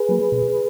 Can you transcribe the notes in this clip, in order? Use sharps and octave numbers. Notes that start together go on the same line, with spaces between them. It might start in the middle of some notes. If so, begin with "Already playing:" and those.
Already playing: G#4 B4
F#3 A#3
B2